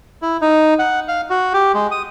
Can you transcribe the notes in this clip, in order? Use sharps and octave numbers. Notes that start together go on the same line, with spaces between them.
E4
D#4
F#5
F5
F#4
G4
G#3
D#6